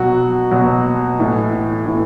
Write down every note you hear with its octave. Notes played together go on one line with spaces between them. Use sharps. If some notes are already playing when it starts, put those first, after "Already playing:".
Already playing: B2 F#3 F#4
B2 F#3
A2 E3
A2 E3